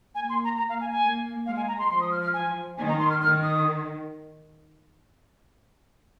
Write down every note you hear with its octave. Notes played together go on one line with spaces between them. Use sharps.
A#3 G#5
C6
A#5
A#5
F5
G#5
G#5
A#3
G#3 F5
G#5
A#5
C6
F3 C6
D#6
F6
F6
G#5
D#3 G#5
A#5
C6
F6
D#3 F6
D#6